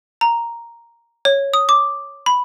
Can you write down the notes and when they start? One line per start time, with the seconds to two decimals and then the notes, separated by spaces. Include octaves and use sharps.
0.21 A#5
1.25 C#5
1.54 D#6
1.69 D6
2.26 B5